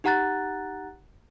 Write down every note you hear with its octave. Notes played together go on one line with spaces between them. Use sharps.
D#4 G4 F#5 A#5 F#6 A6